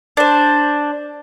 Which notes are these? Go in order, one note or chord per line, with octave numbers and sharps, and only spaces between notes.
D4 C5